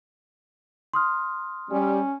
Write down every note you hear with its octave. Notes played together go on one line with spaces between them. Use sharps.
C6 D#6 F6
G3 C#4